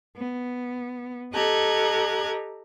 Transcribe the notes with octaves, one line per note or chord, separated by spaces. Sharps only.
B3
G4 A4 D#5 A#5 F#6 G#6